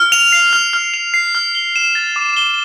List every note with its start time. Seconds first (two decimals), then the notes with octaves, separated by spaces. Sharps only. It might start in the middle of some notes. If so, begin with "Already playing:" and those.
Already playing: F6
0.12 F7
0.32 C7
0.53 F6
0.73 F6
0.94 F7
1.14 C7
1.35 F6
1.55 G7
1.76 E7
1.95 A6
2.16 D6
2.37 G7